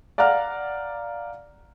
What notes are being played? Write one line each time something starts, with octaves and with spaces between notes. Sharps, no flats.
D5 F5 F#5 A#5 F6